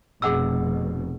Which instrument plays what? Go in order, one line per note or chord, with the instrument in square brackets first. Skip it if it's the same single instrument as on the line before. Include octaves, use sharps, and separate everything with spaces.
[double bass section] F1 B2 [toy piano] G#4 F#5 E6